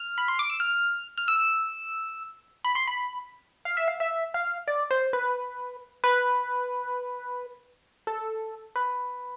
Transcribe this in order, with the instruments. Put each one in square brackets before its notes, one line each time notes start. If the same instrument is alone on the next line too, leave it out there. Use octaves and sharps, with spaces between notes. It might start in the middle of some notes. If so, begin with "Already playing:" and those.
Already playing: [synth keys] F6
B5
C6
D6
E6
F6
F6
E6
B5
C6
B5
F5
E5
F5
E5
F5
D5
C5
B4
B4
A4
B4